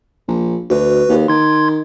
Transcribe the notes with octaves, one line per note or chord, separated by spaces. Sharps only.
A#1
D2 F#4 B4
D#2
D#3 C6 G#6